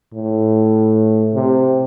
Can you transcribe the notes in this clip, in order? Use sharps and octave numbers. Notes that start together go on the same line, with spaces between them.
A2
C3